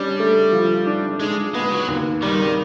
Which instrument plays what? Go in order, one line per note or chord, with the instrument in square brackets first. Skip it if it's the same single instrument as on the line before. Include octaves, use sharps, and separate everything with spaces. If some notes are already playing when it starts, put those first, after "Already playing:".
Already playing: [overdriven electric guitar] G3 [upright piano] C#4 D4
[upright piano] A3
F3
D4
[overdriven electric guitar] G#3 [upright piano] D4
[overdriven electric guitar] G#3 [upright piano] B3
[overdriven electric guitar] F#3
[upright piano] D#2
[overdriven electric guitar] D#3 [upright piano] G3